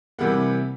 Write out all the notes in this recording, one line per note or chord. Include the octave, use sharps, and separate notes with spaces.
C3 E3 G3 A#3 F#5